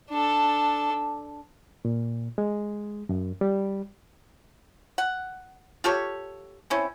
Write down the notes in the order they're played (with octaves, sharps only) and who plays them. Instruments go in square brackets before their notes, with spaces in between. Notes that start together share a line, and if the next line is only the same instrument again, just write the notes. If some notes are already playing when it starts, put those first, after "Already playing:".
[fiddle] D4 A4
[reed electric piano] A#2
G#3
F#2
G3
[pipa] F#5
F4 G4 A4 C#5
C4 C#4 E4